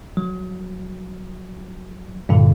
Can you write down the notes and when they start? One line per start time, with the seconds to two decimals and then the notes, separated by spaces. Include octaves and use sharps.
0.17 F#3
2.29 G2 A#2 D3